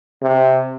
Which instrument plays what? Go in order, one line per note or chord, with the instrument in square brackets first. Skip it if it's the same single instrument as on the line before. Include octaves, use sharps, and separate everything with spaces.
[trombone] C3